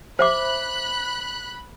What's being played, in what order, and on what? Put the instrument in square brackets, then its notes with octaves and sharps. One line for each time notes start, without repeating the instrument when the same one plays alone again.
[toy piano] C5 E5 D6 [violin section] B5 F#6